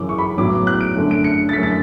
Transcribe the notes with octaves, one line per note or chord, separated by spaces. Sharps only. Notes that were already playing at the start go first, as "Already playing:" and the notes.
Already playing: F#2 C#3 E3 D6
C#6
B5
A1 A2 F#3 B3 D6
F#6
D7
F#2 D3 A3
D7
C#7
A6
F#2 D3 A3 B6
A6